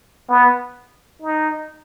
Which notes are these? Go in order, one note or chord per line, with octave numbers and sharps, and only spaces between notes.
B3
D#4